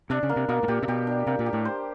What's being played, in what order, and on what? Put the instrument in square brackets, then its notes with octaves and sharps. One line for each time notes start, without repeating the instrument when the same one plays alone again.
[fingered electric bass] C3 [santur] D4
[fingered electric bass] C#3
[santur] A#3
[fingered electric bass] C3
[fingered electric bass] B2 [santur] A#3
[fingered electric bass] A2
[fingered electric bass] A#2 [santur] G4
[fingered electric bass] C3
[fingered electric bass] B2 [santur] G4
[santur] D4
[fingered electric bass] C3 [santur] A#3
[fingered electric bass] A#2
[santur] G4
[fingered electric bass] A2
[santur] C5